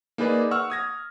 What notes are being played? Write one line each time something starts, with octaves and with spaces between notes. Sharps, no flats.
A#3 D#4 G#4 B4 D5
F#5 C#6 E6 F6
D#6 G#6 A#6